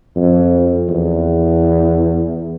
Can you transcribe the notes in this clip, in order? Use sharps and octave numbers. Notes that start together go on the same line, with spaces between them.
F2
E2